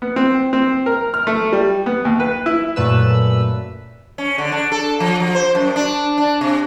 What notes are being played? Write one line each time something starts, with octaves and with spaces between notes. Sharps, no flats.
B3
C4
C4
A#4
F6
A3
G3
B3
D#2
B4
E4
F#2 A#2 A3 B4 E6
C#4
D3
D4
A4
F3
F3
C5
F#2
D4
D4
C3